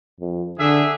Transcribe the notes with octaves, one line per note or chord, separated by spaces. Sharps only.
F2
D3 D4 G#4 E5